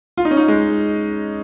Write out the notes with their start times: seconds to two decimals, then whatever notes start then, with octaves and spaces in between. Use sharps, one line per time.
0.18 F4
0.25 D#4
0.31 C#4
0.37 D#4
0.48 G#3